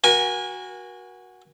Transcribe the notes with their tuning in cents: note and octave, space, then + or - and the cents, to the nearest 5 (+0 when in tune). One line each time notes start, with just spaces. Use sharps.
F#4 +0 A#4 +40 G#5 -20